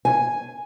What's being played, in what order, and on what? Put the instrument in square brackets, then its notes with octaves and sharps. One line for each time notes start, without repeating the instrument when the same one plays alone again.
[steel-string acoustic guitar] G#5